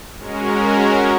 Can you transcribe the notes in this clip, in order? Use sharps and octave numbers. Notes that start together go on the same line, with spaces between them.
G#3 C#4 F#4 A#4